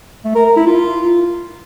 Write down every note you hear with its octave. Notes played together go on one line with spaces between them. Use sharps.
A3
A#4
A#4
E4
F4